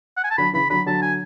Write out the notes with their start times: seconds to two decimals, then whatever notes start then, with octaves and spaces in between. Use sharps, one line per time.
0.17 F#5
0.24 G#5
0.31 A5
0.38 D3 F#3 B5
0.53 C#3 E3 B5
0.70 D3 F#3 B5
0.86 D3 F#3 A5
1.02 G#5